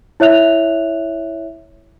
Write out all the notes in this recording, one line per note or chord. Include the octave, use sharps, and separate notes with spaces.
E4 C#5 E5 F#6 F7